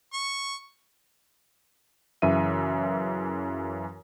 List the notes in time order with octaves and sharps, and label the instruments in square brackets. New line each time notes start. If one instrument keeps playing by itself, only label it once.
[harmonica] C#6
[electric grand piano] F#2 C#3 E3 E5 D#7